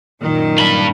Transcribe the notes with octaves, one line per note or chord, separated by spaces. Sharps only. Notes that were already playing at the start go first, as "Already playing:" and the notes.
F#2 A#2 D#3
G2 B5